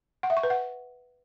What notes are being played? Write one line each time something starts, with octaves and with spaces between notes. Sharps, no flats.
F#5
E5
C#6
B4
F#5